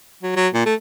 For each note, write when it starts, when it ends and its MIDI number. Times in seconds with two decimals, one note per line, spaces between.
0.23 0.34 54
0.36 0.48 54
0.54 0.64 46
0.66 0.74 57